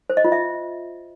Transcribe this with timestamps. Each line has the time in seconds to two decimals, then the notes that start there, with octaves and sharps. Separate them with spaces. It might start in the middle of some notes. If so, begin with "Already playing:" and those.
0.10 C5
0.17 D#5
0.25 F4
0.32 E5